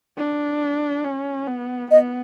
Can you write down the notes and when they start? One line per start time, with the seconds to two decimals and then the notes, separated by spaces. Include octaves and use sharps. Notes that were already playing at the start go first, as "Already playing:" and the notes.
0.18 D4
1.05 C#4
1.47 B3
1.91 B3 D#5